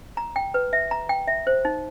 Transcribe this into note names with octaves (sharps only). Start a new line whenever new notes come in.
A#5
G5
B4
E5
A#5
G5
E5
C5
D#4